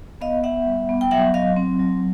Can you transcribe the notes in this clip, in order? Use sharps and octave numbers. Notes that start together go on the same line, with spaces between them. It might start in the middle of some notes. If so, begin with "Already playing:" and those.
B3 D#5 F5
B3 E5 F#5
G3
B3
G5
F#3 E5 F#5
F#3 D#5 F5
C4
F#3